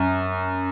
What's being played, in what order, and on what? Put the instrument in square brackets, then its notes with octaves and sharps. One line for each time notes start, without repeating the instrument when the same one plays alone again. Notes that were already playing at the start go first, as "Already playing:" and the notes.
Already playing: [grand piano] F#2